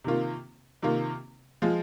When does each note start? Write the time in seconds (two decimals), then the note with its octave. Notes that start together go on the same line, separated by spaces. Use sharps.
0.04 C3 D#3 A#3 F4
0.83 C3 D#3 A#3 F4
1.62 F3 G#3 F4